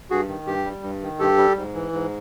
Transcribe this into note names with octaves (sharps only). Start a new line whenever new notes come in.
G2 F#4 G#4
D#3
G2 G4
G3
G2
D#3
G2 G4 A4
G3
G#2
E3
G#2